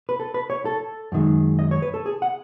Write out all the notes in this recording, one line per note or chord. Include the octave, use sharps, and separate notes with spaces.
B4
A4
B4
C#5
A4
F#2 D#3 G#3
D#5
C#5
B4
A4
G#4
F#5